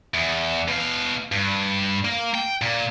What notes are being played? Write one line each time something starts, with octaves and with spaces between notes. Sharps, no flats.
E2
B2 F5
G2
A#3
G5
A#2